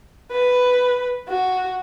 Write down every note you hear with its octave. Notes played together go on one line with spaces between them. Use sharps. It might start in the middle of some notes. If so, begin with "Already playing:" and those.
B4
F#4